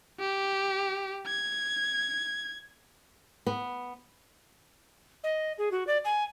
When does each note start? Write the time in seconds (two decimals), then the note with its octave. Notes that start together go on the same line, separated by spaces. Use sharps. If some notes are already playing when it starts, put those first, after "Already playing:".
0.20 G4
1.27 G#6
3.47 B3
5.24 D#5
5.58 G#4
5.71 F#4
5.87 D5
6.05 G#5